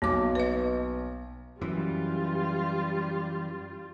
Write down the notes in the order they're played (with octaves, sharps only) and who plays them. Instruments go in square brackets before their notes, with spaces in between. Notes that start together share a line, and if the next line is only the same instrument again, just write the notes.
[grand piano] B1 [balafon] A#3 D6
[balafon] B4 D#5
[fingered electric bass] F#2 [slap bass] E3 [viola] G3 F4